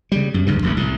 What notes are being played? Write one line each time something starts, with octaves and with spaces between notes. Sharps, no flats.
C#3 G3
F#2
D2 G2 C#3 E3
E1 A1 D#2 C3
C2 A2